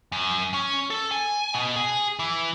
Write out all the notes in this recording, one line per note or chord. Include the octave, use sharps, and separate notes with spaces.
F#2
C#4
A4
G#5
B2
G#4
E3